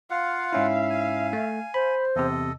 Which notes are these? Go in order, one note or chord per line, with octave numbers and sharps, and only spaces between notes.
F4 F5 F#5
G#2 C#4 E4 E5
G#5
A3
C5 B5
E2 C3 A4 D#5